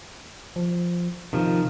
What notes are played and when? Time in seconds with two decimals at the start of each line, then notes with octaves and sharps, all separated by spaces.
0.56 F3
1.33 C3 D#3 F3